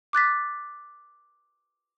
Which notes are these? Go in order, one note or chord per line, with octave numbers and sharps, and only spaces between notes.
D6 F#6 A6 B6